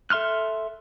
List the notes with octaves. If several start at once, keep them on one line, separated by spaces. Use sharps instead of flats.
A4 E5 C6 F6 F#6